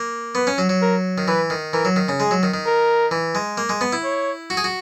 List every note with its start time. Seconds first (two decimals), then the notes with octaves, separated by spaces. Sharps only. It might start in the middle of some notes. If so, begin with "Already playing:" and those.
Already playing: A#3
0.35 B3 B4
0.47 C#4
0.58 F#3
0.69 F#3
0.82 A#4
1.18 D#3
1.28 E3 B4
1.50 D#3
1.73 E3 A#4
1.85 F#3
1.96 D#3
2.08 C#3
2.20 G#3 G#4
2.31 F#3
2.43 D#3
2.54 D#3
2.66 A#4
3.11 E3
3.35 G#3
3.58 A#3
3.69 G#3
3.81 B3
3.93 E4
4.04 C#5
4.50 F#4
4.57 G#4
4.64 F#4